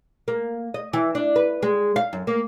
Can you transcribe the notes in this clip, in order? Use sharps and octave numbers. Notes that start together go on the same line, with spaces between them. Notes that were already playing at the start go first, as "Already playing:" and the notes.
A#3
D#5
E3
D4
B4
G#3
F5
F#2
A#3